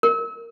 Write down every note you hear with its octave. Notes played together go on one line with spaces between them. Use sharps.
A#4